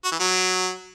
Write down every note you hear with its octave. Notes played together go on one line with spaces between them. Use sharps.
F#4
E3
F#3